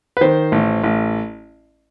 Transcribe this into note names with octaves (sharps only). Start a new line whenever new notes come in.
B4
D#3 C5
A1
A1